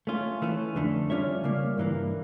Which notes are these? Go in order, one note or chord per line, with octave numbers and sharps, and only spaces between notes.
A3 C#4 F4
E3 A3 C#4
F2 D3 A3
G3 C#4 F4 C#5 E5
C#3 G3 A#3
G2 E3 A#3